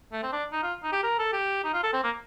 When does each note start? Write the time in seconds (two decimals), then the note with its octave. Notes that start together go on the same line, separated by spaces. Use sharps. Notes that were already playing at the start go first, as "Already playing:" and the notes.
0.12 A3
0.23 C4
0.33 D4
0.52 D#4
0.63 F4
0.83 D#4
0.92 G4
1.03 A#4
1.19 A4
1.33 G4
1.64 D#4
1.74 F4
1.83 A4
1.93 C4
2.04 A#3